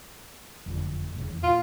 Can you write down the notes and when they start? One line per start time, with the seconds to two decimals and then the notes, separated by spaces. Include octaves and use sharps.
0.66 F#1 F2 D3
1.14 F1 G#2 C#3
1.30 E2
1.43 A#2 F4